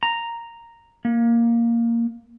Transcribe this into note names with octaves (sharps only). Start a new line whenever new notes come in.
A#5
A#3